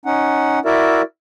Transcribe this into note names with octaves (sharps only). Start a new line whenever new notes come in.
C#4 D#4 F#5
E4 F#4 A#4 D5 E5